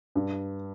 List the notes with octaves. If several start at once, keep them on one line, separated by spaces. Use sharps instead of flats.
G2